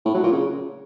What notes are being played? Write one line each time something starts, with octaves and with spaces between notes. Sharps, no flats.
A2
F#3
A#2
C#3